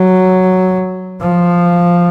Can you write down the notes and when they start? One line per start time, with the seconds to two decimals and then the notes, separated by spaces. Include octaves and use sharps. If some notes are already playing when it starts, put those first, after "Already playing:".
Already playing: F#3
1.20 F3